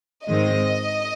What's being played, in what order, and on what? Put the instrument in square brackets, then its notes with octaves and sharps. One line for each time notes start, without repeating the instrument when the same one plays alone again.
[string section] G#2 D#3 G#3 C4 D#5